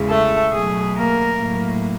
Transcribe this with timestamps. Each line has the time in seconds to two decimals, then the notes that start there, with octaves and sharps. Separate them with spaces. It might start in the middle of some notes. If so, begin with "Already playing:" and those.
Already playing: E2 C#3 E3 G#3
0.08 A3 A4
0.51 B2 F#3 A3 G#4
0.95 A#3 A#4
1.39 A2 F#3 A#3